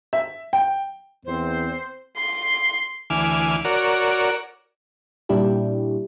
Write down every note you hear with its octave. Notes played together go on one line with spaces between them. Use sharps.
E5
G5
E2 C4 C5
C6
D2 E3 G#5 D6 F6
F#4 A#4 C#5 D5
A#2 G3 D4 E4 G4